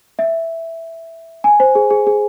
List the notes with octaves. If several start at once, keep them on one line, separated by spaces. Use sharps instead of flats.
E5
G#5
C5
G#4
G#4
G#4